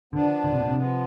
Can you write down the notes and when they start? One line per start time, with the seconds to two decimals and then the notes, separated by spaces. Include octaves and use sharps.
0.13 D3 F3 B3 D4
0.44 D3
0.52 C3
0.60 B2
0.68 C3
0.76 F3 G#3 B3